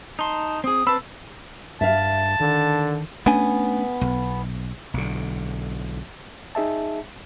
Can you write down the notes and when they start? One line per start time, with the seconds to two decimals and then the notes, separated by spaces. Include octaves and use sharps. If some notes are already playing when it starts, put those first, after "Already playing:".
0.19 D#4 A5 C6
0.64 C4 G#4 D#6
0.87 C4 B4 A5 B5 E6
1.81 G2 E5 F5 A5
2.40 D3 D#3
3.26 A3 B3 C#4 D4 G#5
4.01 B1
4.94 B1 D3
6.55 D#4 G#4 E5 A5